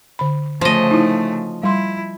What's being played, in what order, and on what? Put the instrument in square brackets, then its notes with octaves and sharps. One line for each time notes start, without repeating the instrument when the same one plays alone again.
[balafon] D3 B5
[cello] C#3 A3 [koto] F3 D#5
[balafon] D#4 E4
[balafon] G3 C6 [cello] E4